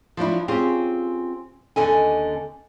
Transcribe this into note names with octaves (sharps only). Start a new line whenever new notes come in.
F3 F#3 D4 E4
C4 C#4 F4 G4 G#4
D#2 D3 C#4 A4 D#5 G#5